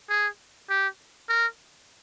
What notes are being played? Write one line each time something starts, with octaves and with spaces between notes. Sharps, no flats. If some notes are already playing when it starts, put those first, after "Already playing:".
G#4
G4
A#4